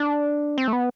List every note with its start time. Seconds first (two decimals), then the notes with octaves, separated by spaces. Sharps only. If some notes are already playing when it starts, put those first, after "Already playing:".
Already playing: D4
0.58 C4
0.68 A3
0.73 B3